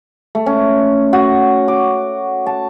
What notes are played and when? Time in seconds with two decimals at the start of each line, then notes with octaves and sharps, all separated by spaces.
0.35 A3
0.46 C#4
1.13 F#4
1.68 D6
2.46 A5